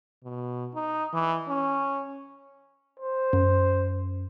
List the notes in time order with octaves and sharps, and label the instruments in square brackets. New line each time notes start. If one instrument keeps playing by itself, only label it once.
[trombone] B2
D#4
E3
C#4
[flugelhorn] C5
[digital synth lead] F#2